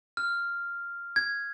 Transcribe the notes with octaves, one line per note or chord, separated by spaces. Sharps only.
F6
G#6